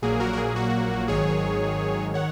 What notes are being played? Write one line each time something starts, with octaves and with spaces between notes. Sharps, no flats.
A#1 A#2 F#3 A#3 G#4
F#4 A#4
A#4
G#4
F#4
G#1 G#2 D#3 F#3 G#4 C#5
D#3 C#5 F#5